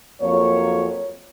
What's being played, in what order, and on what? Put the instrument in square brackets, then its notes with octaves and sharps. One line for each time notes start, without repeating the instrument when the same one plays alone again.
[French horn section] F2 F#3 A#3 C#5